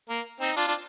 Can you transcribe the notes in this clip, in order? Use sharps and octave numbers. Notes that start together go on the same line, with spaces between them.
A#3
C4 D#4
D4 F4
D4 F4